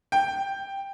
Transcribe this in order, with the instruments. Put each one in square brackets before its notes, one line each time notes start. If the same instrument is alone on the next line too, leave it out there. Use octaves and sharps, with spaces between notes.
[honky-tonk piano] G5